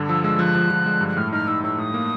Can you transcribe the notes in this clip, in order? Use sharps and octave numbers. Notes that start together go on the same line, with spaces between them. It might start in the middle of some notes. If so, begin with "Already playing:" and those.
Already playing: G2 D3
F3 E6
G#3 E6
F3 F#6
F3
F3
G#3
G2
F#6
A2 F6
D#4 F6
D#4 E6
A2 E6
A2 D#6
A#3